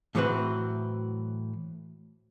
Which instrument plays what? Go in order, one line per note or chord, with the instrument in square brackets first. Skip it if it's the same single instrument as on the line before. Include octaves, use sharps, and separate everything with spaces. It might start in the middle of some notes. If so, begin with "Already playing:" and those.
[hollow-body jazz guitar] A2 E3 F#3 C4 F#4 B4